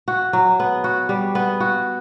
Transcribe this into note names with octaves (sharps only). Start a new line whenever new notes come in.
F#4
F#3
B3
F#4
G3
B3
F#4